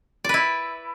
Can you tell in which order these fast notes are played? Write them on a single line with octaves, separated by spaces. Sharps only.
D5 B4 E4